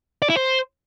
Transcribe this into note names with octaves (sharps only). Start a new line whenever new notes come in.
D5
E4
C5